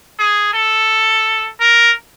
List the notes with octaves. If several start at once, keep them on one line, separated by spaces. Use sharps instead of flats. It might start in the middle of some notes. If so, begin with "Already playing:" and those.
G#4
A4
A#4